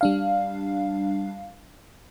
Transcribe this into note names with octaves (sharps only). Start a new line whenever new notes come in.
G3 D4 F5